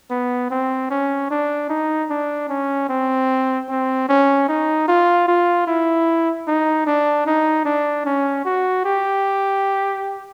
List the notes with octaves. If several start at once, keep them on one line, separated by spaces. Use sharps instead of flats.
B3
C4
C#4
D4
D#4
D4
C#4
C4
C4
C#4
D#4
F4
F4
E4
D#4
D4
D#4
D4
C#4
F#4
G4